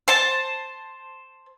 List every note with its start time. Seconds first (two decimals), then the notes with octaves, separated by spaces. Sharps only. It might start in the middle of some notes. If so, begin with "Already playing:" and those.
0.08 C5 A5